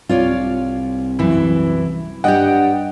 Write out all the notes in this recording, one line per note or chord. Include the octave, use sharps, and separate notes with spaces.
C2 F4 C#5 D5
F#2 E3 E4
G2 G4 D5 D#5 F#5 G5